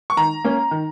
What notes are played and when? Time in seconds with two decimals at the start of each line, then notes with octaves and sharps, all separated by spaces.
0.10 C#6
0.17 D#3 A#5
0.44 A#3 C#4
0.71 D#3